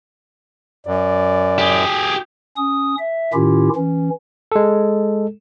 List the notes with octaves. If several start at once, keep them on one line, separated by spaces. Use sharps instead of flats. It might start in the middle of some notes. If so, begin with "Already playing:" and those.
F#2 D5
G4 G#4
C#4 D#6
E5
A2 D#3 C#4 E4 F4 G4
E3 C#4
G#3 A4